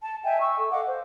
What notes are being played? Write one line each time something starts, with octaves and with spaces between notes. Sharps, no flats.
A5
D#5 E5 G5 G#5
C#6 E6
A4
D#5 F5 F#5 D6
C5